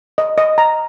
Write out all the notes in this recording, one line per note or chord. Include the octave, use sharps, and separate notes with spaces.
D#5
D#5
A#5